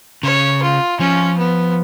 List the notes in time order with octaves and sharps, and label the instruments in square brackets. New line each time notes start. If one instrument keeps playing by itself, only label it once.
[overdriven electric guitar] C#3 [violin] C#5
[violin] F4
[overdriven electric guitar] F3 [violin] C#4
[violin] B3